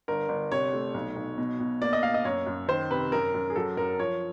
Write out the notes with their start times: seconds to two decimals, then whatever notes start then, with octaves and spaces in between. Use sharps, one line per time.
0.08 G1 A#4
0.29 G1
0.52 C3 C#5
0.74 A3
0.94 B1
1.16 B1
1.38 B2
1.60 B2
1.82 A#3 D5
1.93 D#5
2.03 A#3 F5
2.14 D#5
2.25 F#2 C#5
2.46 F#2
2.68 D#3 C5
2.91 C3 B4
3.12 F#2 A#4
3.34 F#2
3.50 G#4
3.56 F#3 A4
3.77 F#2 A#4
3.99 F3 C#5